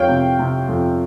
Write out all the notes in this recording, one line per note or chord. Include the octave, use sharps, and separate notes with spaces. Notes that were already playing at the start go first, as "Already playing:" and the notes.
Already playing: F2 C#5 F5 G5
C3
C3
F2